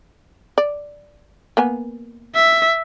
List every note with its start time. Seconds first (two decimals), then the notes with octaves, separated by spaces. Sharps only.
0.58 D5
1.57 A#3 B3 G#5
2.35 E5